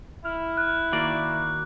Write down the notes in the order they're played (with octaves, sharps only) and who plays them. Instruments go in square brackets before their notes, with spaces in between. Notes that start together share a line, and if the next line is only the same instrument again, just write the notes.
[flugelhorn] E4 [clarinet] F6
[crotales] F#6
[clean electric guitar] D#3 A#3 D5 [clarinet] F#4